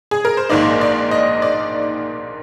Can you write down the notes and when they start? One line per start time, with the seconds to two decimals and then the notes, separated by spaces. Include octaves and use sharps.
0.11 G#4
0.25 A#4
0.37 C5
0.49 A#1 G#2 D#3 A#3 D#4 D5
0.81 D5
1.11 D#5
1.42 D5